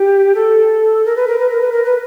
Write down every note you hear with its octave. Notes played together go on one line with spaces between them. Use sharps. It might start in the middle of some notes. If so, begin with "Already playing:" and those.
Already playing: G4
A4
A#4
B4
A#4
B4
A#4
B4
A#4
B4